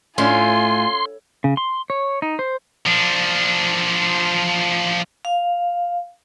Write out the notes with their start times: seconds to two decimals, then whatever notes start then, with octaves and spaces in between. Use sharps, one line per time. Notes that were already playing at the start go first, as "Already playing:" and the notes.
0.18 A2 C#4 F4 G#5 C6
1.44 C#3
1.57 C6
1.90 C#5
2.22 D#4
2.39 C5
2.86 F3 D4
5.25 F5